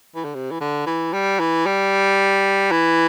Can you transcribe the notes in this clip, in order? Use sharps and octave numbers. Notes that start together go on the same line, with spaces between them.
E3
D3
C3
E3
D3
E3
G3
E3
G3
E3